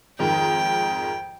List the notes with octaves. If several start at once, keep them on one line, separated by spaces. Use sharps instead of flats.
F2 G#2 D#3 G5